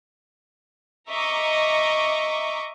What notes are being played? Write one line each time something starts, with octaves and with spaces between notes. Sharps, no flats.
D#5 E5 A#5 C#6 D6